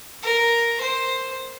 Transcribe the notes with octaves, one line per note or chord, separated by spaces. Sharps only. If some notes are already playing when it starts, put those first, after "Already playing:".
A#4
C5